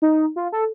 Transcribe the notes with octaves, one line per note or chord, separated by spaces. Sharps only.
D#4
F4
A4